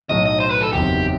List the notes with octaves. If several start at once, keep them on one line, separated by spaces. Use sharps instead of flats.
B1 A2 F#3 A3 D#4 D#5
D#5
C5
B4
A4
F#1 E2 D#3 F#3 C4 G4